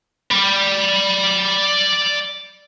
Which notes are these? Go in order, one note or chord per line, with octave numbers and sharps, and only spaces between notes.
D5 B5